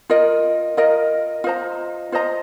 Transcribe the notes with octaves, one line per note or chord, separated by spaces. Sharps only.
F4 A#4 D#5
F4 A#4 D#5
F4 C5 D#5 A#5
F4 C5 D#5 A#5